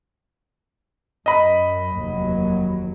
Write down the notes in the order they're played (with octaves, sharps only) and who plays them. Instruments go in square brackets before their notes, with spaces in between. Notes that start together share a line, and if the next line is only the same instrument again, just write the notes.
[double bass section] F#2 [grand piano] D#5 B5
[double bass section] F1 D#2 F#3